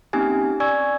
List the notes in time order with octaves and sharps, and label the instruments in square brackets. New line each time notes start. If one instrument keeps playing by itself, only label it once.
[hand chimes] A#3 C4 C#4 D#4 G4 G#5
D5 G#5 C#6 E6 G#6